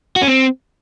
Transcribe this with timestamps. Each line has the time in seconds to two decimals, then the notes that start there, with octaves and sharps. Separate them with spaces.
0.16 F#4
0.22 C#4
0.28 C4